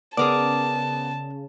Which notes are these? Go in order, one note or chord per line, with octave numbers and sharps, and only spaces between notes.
C#3 B3 G#4 A#4 D5 A5